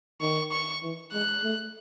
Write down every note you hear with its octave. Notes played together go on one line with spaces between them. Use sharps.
D#3 C#6
C#6
E3
G#3 F#6
A3